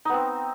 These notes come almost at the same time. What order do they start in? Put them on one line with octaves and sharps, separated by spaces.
D#4 B3 C4